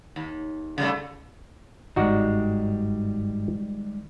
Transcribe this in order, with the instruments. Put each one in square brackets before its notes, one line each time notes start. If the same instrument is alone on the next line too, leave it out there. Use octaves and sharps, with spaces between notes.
[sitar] D#2
C#3 G3 A3
[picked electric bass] G1 G#2 [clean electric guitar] D#3 G3 G#3 [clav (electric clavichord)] D#4 F#4 D5